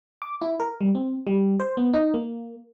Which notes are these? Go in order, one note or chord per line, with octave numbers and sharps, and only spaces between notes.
D6
E4
A#4
G3
C4
G3
C5
B3
D#4
A#3